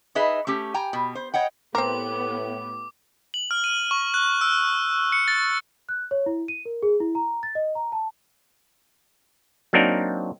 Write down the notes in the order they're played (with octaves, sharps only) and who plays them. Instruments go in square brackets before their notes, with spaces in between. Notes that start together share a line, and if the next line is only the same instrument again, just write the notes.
[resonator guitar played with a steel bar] D#4 G#4 B4 D#5 E5
A3 C#4 G4
G5 G#5 A#5
B2
C5
C#5 D#5 F#5 G5
[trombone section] A2 [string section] B3 G4 [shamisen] C4 A#4 [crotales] D6
[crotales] F#7
F6
D#7
C#6
F#6
E6
C#7
A6
[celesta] F#6
C#5
E4
D#7
A#4
G#4
E4
A#5
A6
D#5
A#5
A5
[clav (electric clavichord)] F#3 A#3 C4 D4 D#4 A#4